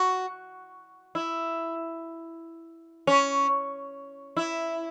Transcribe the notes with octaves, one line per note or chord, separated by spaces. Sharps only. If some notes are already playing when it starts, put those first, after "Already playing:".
Already playing: F#4
E4
C#4
E4